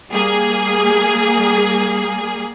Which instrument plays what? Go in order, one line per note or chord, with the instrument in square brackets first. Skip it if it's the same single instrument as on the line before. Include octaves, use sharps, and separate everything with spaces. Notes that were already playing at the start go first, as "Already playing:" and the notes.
[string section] G3 A#3 G#4